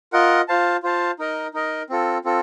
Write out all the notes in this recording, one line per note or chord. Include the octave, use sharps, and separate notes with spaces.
F4 A#4 D#5 F#5
F4 C5 F5 A5
F4 C5 F5 A5
D#4 A#4 D#5
D#4 A#4 D#5
C4 F4 A4
C4 F4 A4